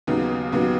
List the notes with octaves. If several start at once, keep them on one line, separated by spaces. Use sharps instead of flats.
D#2 C#3 F#3 B3 D#4
D#2 C#3 F#3 B3 D#4